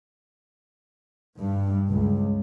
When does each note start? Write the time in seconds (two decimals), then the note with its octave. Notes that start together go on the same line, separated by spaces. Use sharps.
1.39 G2
1.88 C#2